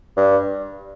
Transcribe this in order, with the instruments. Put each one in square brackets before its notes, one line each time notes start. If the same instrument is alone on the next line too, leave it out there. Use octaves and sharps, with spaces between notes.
[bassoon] G2